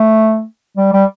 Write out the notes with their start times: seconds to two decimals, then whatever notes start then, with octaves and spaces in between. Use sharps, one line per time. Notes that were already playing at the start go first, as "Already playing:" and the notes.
Already playing: A3
0.77 G3
0.93 G3